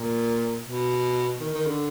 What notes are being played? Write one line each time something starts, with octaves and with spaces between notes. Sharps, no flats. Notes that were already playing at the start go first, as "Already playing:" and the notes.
Already playing: A#2
B2
D#3
D#3
D3